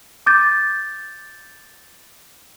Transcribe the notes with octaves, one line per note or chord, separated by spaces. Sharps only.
D6 G6 A6